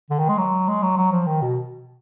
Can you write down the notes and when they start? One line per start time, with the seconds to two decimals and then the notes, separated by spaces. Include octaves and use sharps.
0.10 D3
0.19 D#3
0.29 G#3
0.38 F#3
0.68 G#3
0.82 F#3
0.97 F#3
1.12 F3
1.26 D#3
1.42 B2